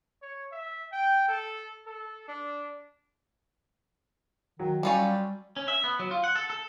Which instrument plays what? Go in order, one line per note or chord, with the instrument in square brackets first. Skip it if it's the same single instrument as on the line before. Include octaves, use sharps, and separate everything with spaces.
[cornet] C#5
E5
G5
A4
A4
D4
[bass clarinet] D#3 [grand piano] F#3
[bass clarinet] G3 [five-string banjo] C#4 F4 A4
[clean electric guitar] C#4
E5
B3
F#3
F4
F#5
A4
A4